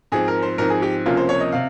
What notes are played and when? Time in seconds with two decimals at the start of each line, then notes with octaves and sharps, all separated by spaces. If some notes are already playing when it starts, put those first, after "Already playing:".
0.12 G#2 F3 C4 G#4
0.28 A#4
0.43 C5
0.58 G#2 F3 C4 A#4
0.70 G#4
0.82 G4
1.06 C#2 C3 F3 A#3 C#4 F4
1.17 C5
1.29 C#5
1.40 D#5
1.52 C3 F5